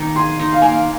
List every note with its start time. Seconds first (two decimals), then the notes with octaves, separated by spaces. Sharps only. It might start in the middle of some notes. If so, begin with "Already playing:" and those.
Already playing: D#3 A#3 D#4 A#5
0.16 G#4 C6
0.40 D#4
0.53 F5
0.62 A#3 G#5